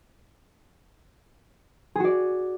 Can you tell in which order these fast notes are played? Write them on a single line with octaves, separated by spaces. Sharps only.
G#4 F#4 D5